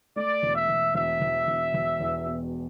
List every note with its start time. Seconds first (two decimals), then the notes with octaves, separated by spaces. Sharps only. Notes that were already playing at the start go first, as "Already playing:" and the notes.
0.16 A3 D5
0.43 E1
0.55 E5
0.69 E1
0.94 E1 E5
1.21 E1
1.47 E1
1.74 E1
2.00 E2
2.26 B2